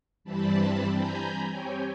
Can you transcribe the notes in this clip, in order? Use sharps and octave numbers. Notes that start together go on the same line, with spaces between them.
G2 E3 G3 C4 A5 B5
G#5 A#5 B5 G6
C4 G4 C#5 G5 G#5